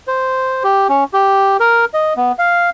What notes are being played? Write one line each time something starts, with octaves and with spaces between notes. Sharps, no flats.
C5
G4
C#4
G4
A#4
D#5
B3
F5